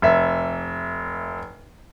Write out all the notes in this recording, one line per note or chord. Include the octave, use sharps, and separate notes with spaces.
F1 E5